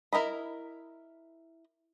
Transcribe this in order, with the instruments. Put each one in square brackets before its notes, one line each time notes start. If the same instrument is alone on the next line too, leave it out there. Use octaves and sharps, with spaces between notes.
[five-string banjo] E4 A#4 D#5 B5